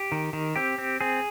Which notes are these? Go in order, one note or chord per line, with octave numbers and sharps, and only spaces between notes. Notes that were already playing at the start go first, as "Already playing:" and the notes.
Already playing: G4
D#3
D#3
C4 G4
C4
C4 G#4